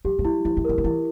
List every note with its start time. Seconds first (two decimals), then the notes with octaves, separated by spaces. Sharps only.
0.05 F#3 G4
0.19 G3
0.24 F#3 E4
0.45 F3 E4
0.57 E3
0.65 F3 A#4
0.78 D#3
0.84 E3 E4